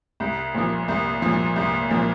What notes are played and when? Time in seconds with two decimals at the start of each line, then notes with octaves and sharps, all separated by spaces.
0.20 C2
0.54 A#2 F3
0.88 C2
1.22 A#2 F3
1.56 C2
1.91 A#2 F3